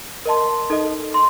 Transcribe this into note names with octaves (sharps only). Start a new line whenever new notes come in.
A#4 D#5 A5 C6
D#4 A4 D#5
C6